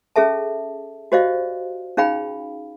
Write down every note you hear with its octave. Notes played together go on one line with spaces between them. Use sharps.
C#4 G#4 A4 E5 A5
F#4 G4 C5 D5 D#5 F5
C#4 D#4 G#4 F5 G5 B5